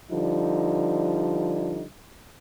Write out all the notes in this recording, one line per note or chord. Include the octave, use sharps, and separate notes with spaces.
D3 F3 G3 D#4